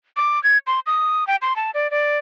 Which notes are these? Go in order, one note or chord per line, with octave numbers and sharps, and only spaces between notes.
D6
G#6
C6
D#6
G5
C6
A5
D5
D5